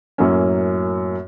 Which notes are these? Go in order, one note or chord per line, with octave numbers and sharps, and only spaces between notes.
F#2 A2 F#3 A#3 C#4